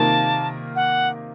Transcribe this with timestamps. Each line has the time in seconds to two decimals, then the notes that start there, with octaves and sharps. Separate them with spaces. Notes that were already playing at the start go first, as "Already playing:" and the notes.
Already playing: C3 D#3 A#3 F4 A#4 A5
0.76 F#5